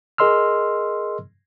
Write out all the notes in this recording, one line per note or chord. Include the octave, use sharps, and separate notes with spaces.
G#4 A#4 D#5 C6 E6 F6